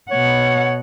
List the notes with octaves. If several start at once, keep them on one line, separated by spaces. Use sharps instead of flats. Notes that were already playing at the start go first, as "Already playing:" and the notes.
B2 C#5 F#5